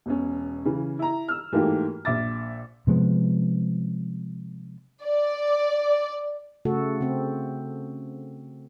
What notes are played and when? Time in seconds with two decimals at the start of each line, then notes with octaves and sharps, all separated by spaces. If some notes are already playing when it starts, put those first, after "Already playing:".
0.06 E1 B2 C#4
0.65 C#3 E3 C#4
0.99 E4 A#5
1.28 E6 F6
1.52 G#2 E3 A3 A#3 F#4 G4
2.05 A#1 E5 D6 A6
2.87 C3 F3 G#3 B3
5.04 D5
6.65 C#3 A3 F#4 A4
7.01 C#3 C4